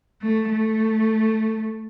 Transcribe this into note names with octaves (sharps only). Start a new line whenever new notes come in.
A3
A3